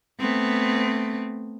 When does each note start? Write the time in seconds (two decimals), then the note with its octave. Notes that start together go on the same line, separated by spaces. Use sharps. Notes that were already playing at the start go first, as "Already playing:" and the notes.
0.20 A3 B3 C4